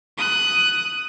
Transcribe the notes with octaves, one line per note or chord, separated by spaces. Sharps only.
D#6 F#6